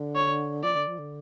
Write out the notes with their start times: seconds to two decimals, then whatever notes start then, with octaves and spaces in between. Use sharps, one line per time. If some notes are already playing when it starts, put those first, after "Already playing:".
Already playing: D3
0.15 C#5
0.63 F3 D5
0.75 D3
0.87 F3
0.98 D3